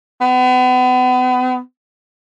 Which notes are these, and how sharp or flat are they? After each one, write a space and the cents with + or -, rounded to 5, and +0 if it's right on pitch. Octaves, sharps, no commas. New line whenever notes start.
B3 +35